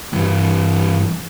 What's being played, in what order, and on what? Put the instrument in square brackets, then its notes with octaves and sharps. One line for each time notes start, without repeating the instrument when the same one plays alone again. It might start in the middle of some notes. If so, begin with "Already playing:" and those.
[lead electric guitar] G2 E3